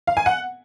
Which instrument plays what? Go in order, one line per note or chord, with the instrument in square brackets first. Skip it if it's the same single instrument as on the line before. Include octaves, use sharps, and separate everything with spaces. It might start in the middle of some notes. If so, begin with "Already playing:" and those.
[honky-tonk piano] F5
G#5
F#5